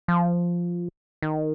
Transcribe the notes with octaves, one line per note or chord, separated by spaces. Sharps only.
F3
D#3